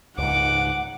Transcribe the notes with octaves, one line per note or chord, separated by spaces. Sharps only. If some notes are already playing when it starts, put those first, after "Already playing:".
C#2 G#2 F#5 D6